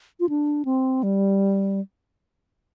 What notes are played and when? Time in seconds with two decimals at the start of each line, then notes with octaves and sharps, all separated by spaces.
0.20 F4
0.29 D4
0.65 C4
1.03 G3